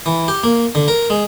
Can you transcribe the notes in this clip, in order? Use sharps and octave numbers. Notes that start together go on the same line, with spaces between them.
E3
G4
A#3
D3
A#4
G#3